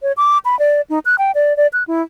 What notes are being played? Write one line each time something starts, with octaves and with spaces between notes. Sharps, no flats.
C#5
D6
B5
D5
D#4
F#6
G5
D5
D5
F#6
E4